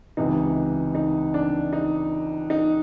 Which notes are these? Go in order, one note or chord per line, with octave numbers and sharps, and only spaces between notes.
C#2 C3 E3 D#4
D#4
D4
D#4
D#4